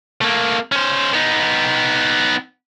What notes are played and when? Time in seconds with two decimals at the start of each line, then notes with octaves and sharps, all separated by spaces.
0.21 A3 A#3
0.72 C#4 C5
1.13 B3 D#4